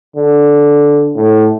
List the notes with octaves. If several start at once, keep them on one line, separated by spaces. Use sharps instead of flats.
D3
A2